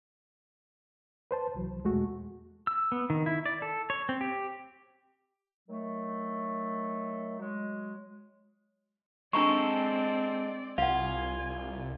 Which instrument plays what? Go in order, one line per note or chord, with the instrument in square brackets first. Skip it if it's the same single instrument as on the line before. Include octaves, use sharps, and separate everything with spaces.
[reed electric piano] B4 C5 A5
C2 E3 F#3
[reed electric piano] E2 B2 [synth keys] G#3 A3 F#4
[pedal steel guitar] E6
B3
D#3
E4
D5
A4
C#5
C4
G4
[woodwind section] D#3 F#3 A3
F#3 G#3
[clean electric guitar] G#3 A4 [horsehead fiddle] C4 D5 [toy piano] D4 A#5 C#6
[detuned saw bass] C2 [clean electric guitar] F4 [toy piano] F5 F#5 [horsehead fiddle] G#5